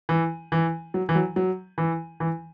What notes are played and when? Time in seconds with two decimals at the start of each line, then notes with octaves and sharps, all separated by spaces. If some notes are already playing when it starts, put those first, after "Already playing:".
0.09 E3
0.52 E3
0.94 F#3
1.09 E3
1.15 F#3
1.36 F#3
1.78 E3
2.20 E3